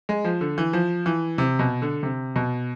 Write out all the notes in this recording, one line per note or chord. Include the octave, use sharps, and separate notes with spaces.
G#3
F3
D3
E3
F3
E3
C3
B2
D3
C3
B2